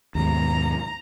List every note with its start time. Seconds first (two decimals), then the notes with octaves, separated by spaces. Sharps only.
0.15 D#2 G#2 B2 A#5